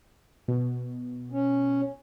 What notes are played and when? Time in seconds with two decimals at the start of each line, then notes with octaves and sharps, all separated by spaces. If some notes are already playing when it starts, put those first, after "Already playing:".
0.48 B2
1.32 C#4